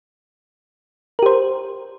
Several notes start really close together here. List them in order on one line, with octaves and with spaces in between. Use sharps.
A#4 G4 C5